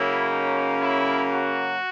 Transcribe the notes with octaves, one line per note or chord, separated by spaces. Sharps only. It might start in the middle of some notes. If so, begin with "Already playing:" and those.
Already playing: C#3 F#3 A#3 C#4 E4
D#4
E4
F#3 F#4